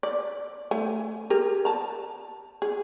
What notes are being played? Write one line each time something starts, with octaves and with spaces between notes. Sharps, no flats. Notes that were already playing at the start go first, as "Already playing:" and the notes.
D5
A3 G#5
G4 G#4 A#4
A5 A#5
G#4